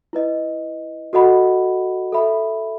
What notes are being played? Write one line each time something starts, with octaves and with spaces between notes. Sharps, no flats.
E4 B4 D#5
F#4 A4 D#5 F#5 B5
A4 E5 B5